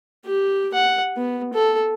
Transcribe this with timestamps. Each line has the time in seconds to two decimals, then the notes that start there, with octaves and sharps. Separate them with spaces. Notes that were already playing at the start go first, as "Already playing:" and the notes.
0.25 G4
0.74 F#5
1.17 B3
1.54 A4